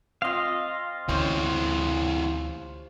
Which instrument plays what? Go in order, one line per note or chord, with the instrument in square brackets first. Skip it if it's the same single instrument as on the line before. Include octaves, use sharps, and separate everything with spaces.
[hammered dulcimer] C4 F4 [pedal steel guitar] D#5 F5
[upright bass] D2 C#4 [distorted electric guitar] E3 C4 [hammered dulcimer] G4 C5 C#5